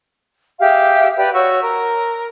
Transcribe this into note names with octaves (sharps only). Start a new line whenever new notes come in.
G4 G#4 E5 F5
G4 B4 D5
F#4 C#5 C#6 E6
A#4